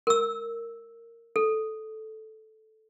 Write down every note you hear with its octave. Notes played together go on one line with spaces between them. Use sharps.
A#4 E6
A4